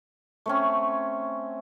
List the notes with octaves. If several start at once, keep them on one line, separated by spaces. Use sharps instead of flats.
A3 C4 C#4